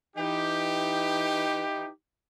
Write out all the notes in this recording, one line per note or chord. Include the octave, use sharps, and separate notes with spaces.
E3 D#4 G4